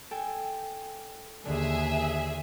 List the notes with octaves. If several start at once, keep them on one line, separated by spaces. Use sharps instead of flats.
A4 G5 G#5
D#2 D3 G#4 E5